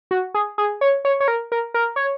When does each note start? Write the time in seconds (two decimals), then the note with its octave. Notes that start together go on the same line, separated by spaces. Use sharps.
0.11 F#4
0.34 G#4
0.58 G#4
0.81 C#5
1.05 C#5
1.20 C#5
1.28 A#4
1.52 A#4
1.74 A#4
1.96 C#5